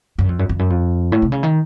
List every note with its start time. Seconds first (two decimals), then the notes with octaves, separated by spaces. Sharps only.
0.19 F#2
0.29 F2
0.39 F#2
0.49 F2
0.59 F#2
0.70 F2
1.12 A2
1.22 C3
1.32 C#3
1.43 D#3